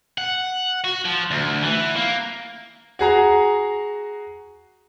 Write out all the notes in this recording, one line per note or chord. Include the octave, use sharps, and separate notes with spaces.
F#5
F#4
F3
D2
E3
A#3
F#4 G#4 A#5